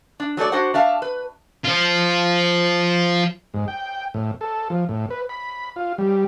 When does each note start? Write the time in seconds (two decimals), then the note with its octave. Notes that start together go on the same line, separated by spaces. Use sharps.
0.20 D4
0.37 F#3 A3 A4 D5
0.52 D4 F#4 C5 F#5
0.74 D4 E5 F5 A5
1.02 B4
1.64 F3 F4
3.54 G#2
3.68 G5
4.14 A2
4.41 A4
4.70 F3
4.89 A2
5.10 B4
5.29 B5
5.76 F4
5.98 G3